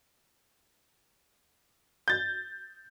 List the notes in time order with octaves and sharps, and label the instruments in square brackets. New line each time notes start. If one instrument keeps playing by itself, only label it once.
[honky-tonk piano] G6 A6